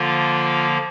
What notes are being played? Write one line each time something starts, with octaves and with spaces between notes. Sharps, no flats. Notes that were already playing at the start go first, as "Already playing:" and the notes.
Already playing: D3 F3 A#3 F4